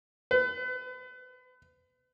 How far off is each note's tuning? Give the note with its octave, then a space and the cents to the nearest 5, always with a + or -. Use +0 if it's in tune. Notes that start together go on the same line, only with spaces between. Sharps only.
B4 +35